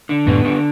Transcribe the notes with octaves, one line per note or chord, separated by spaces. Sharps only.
D3
F#2 A2 B3
D3